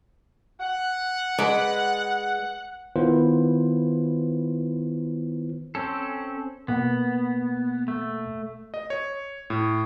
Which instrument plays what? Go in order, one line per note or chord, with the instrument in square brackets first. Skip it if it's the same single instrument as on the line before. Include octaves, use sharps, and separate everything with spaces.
[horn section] F#5
[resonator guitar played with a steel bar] G#3 B4 D5
[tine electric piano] D#3 B3 E4 F4 B4 C5
[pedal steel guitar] C4 C#4 A4
[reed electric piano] B2 A#3 F#5 [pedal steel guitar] B3
[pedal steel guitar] A3
[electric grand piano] D#5
C#5
A2